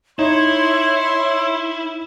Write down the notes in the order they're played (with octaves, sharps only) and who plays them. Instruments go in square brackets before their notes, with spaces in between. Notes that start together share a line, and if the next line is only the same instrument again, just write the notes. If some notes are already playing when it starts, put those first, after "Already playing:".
[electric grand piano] D#4 [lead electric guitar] E4 [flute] C#5 [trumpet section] C6